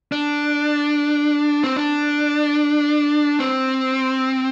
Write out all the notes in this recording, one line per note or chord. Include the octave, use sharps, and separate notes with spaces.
D4
C4
D4
C4